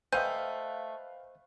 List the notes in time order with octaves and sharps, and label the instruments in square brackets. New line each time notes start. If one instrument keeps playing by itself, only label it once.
[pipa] A3 G#5 [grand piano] B4 F5 G5 [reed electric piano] C5 D#5 [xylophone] G6